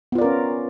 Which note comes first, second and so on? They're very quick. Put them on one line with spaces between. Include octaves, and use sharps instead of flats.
B3 F4 D5 A#4 C#4